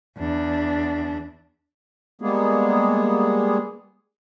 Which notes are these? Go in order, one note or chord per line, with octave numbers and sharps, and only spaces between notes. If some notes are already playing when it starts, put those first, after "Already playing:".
E2 D4
G3 G#3 A#3 B3 G#4